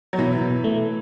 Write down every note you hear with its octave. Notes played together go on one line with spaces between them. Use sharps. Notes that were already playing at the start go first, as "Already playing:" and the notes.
F#3
B2 E3
B2
A3